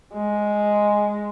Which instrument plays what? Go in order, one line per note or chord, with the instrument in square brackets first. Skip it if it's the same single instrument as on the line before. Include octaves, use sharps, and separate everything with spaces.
[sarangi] G#3